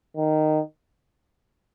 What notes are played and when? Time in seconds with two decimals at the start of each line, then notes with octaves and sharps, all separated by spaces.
0.17 D#3